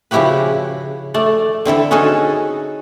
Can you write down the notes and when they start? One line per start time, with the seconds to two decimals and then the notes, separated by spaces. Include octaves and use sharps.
0.11 C#3 F3 E4 F#4 G4 B4
1.14 A3 D5
1.65 D3 C4 E4 A4
1.91 C#4 D#4 F#4 G#4 A4